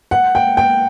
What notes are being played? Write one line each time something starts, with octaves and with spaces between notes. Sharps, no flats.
F#5
G5
G5